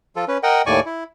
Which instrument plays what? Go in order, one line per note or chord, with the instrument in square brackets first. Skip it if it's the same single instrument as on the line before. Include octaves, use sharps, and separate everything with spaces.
[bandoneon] F3 F4 A4
C#4 B4
A#4 D#5 F#5 G5
D#2 A2 D5 G#5 C#6
E4